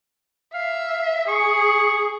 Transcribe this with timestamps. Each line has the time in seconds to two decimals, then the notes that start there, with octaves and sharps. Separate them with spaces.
0.54 E5 F5
1.28 G#4 C#6